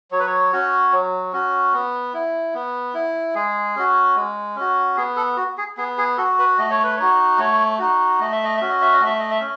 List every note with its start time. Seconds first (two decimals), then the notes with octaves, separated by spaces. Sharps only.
0.11 F#3 C#5
0.19 B4
0.27 C#5
0.53 C#4 F#4
0.92 F#3
1.33 C#4 F#4
1.73 B3
2.14 E4
2.54 B3
2.94 E4
3.35 G#3 G#4
3.76 C#4 F#4
4.16 G#3
4.56 C#4 F#4
4.97 B3 G#4
5.16 A4
5.37 F#4
5.58 G#4
5.77 B3 G#4
5.98 G#4
6.17 F#4 A4
6.39 B4
6.58 A3 D#5
6.71 C#5
6.84 B4
6.97 D#4 F#4 C#5
7.38 A3 C#5
7.79 D#4 F#4
8.20 A3 D#5
8.32 E5
8.44 D#5
8.57 C#4 F#4 E5
8.69 D#5
8.81 E5
8.93 D#5
9.00 A3
9.06 E5
9.19 D#5
9.31 E5
9.41 C#4